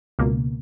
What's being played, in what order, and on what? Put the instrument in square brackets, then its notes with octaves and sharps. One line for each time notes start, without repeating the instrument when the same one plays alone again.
[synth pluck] C#2 B2 A#3